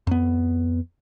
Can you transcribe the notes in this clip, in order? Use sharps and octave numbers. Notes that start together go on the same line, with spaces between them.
F2 B3